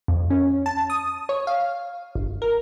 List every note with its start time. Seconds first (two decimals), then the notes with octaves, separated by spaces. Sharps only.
0.08 F2
0.30 C#4
0.66 A5
0.90 D#6
1.29 C#5
1.47 F5
2.15 G1
2.42 A#4